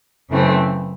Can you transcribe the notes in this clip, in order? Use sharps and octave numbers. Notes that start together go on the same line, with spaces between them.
F#2 C#3 E3 A3 C4